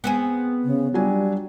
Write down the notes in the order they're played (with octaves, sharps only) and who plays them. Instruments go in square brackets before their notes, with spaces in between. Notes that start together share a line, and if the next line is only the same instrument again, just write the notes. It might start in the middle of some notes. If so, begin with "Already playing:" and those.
[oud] B3 C4 G#4
[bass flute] C#3
[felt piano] F#3 D4 G#5 [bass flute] G3